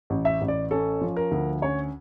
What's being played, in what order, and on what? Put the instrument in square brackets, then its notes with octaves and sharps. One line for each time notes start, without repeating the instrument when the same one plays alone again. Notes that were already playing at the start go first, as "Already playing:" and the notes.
[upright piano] A1
E5
A1
D5
C#4 A4
F3
A#4
D2
C#4 C#5